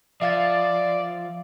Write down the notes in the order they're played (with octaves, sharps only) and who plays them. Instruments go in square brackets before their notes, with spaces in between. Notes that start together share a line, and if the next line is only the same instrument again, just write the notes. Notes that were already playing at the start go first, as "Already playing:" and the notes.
[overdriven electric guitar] F3 [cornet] D5 [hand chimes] E5 F5 A6